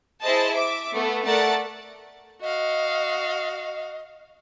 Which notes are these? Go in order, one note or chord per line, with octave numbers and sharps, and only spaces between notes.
E4 G#4 C5 D#5 A5
E5 D6
A3 B3
A3 A#4 D5 F#5 A5 A6
F#4 D#5 F5